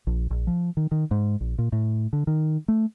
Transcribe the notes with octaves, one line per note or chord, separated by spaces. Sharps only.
A#1
A#1
F3
D#3
D#3
G#2
A#1
A#2
A2
D3
D#3
A3